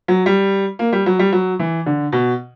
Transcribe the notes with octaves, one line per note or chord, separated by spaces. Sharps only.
F#3
G3
A#3
G3
F#3
G3
F#3
E3
D3
B2